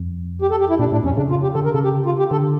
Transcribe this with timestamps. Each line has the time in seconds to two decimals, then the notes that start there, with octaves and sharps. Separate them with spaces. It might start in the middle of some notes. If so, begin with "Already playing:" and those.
Already playing: F2
0.42 G4
0.51 A4
0.60 G4
0.69 E4
0.79 A#2 D4
0.92 A2 D4
1.04 F2 C#4
1.17 C#3 D4
1.30 F4
1.43 G4
1.55 D3 A4
1.65 A#4
1.74 C#3 A4
1.84 G4
2.06 F4
2.19 G4
2.31 D3 A4